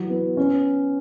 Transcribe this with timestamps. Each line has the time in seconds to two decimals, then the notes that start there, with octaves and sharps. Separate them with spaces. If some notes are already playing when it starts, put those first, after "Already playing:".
Already playing: E3 F#3
0.10 B3
0.37 C#4